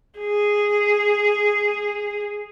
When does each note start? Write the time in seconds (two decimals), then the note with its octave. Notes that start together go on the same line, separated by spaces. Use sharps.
0.19 G#4